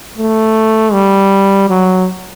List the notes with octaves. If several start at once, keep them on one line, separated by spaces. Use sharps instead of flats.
A3
G3
F#3